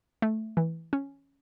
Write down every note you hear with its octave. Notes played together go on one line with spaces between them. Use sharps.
A3
E3
C#4